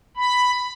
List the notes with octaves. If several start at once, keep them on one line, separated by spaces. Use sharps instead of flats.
B5